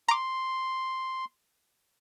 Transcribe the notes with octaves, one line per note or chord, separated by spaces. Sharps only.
A#5 C6 D6